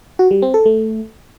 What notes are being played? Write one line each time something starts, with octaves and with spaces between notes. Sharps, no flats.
F#4
G3
C4
A4
A3